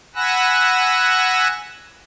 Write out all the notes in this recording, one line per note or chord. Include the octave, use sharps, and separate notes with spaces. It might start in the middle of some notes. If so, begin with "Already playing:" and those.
F#5 G#5 B5 E6 F#6 A#6